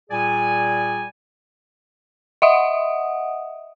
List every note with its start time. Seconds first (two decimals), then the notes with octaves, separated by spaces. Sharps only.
0.10 A#2 G3 G#4 D5 G#5
2.42 D#5 E5 F#5 D#6